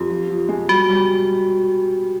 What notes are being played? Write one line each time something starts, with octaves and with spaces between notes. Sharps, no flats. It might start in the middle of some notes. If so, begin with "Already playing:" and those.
Already playing: F2 G4
F3
F3
G#3
G3 F#4
G3